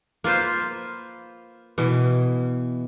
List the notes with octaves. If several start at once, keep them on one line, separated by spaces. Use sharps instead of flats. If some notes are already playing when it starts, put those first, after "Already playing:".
A#3 F4 B4 C5
B2 E3